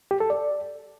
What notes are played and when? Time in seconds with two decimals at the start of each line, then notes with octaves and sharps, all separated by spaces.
0.11 G4
0.20 A4
0.30 D5